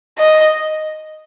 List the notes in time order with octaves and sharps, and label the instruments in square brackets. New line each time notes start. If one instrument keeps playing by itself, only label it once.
[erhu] D#5